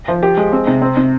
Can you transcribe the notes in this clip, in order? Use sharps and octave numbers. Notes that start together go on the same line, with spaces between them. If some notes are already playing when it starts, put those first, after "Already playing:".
F3
G4
G#3
C4
C3
C4
C3